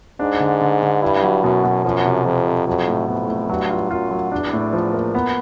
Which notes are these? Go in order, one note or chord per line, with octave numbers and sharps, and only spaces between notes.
G#2 D4
D3
D3
D3
G2 E4
F#3
F#2 B2
B2
F#2 F3
C3
F2 F3
C3
F2 F#3
A2
F2 B3
A2
G2 F#3
F4
F#2 F4
F#3
E2 D4
A2
F3
A#3
B3